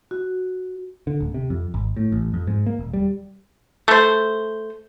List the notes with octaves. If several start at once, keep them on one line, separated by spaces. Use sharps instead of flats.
F#4
D3
D1
C3
F2
G#1
A2
A1
F2
G#2
A#3
D#1
G3
A3 C5